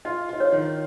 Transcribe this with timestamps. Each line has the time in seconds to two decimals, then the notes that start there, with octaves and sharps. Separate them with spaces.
0.05 F4 D#5
0.29 F4 D#5
0.40 C#5
0.52 D#3